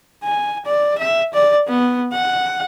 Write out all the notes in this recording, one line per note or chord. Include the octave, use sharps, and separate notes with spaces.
G#5
D5
E5
D5
B3
F#5